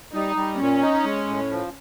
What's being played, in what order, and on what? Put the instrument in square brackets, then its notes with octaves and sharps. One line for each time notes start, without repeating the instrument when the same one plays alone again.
[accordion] G3 [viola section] D#4
[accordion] G3
[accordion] A#2 [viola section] C#4
[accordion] D#4
G#3
A2
F3